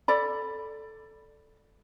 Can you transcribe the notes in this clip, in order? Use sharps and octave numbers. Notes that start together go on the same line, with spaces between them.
A4 D5 B5